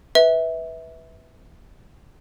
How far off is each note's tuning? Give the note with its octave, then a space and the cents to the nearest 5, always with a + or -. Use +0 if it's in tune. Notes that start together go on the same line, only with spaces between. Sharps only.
B4 +0 E5 -20